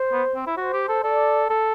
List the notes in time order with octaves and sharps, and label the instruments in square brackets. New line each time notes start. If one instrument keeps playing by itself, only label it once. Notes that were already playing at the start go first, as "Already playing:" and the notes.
Already playing: [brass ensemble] C5
[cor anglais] B3
C4
E4
[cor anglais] F#4 [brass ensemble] C5
[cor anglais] G4
A4
[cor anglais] A4 [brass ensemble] D5
[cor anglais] A4